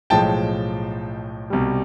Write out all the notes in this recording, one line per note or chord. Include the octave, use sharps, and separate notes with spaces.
B1 A2 F3 G#3 G5 A5
C2 B2 G3